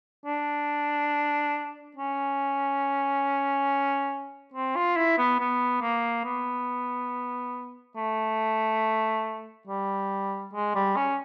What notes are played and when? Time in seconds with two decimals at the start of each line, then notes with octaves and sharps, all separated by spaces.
0.26 D4
1.97 C#4
4.54 C4
4.76 F4
4.96 E4
5.18 B3
5.40 B3
5.82 A#3
6.25 B3
7.96 A3
9.67 G3
10.53 G#3
10.75 G3
10.96 C#4